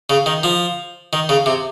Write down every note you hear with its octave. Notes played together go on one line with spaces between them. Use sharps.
C#3
D#3
F3
D#3
C#3
C3